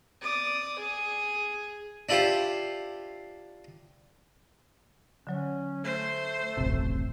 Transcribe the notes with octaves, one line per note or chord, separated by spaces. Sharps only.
D5 D#6
G#4
D4 E4 F4 G4 C5
D3 F#3 C#4 C#5
A3 C5
D#1 A1 F#2 C3